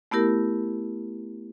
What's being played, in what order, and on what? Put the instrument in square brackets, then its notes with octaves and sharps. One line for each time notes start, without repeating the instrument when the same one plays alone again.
[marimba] A3 B3 E4 G4 A#4